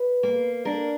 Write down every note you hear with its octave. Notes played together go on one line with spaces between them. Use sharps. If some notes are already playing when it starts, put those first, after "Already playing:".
Already playing: B4
A#3
D4 A#4